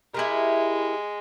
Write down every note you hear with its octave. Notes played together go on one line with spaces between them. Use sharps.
G#3 E4 G4 A#4